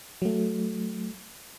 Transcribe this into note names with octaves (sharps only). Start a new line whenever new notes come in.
F#3 A3